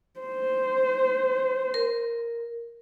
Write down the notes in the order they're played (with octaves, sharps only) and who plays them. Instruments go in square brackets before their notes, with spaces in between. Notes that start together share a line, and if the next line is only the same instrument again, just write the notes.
[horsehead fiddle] C5
[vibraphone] A#4